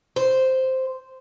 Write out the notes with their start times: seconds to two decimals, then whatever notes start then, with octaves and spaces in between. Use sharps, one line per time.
0.16 C5